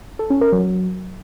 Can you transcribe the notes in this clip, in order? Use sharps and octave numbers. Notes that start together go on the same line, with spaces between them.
A4
C#4
A#4
F#3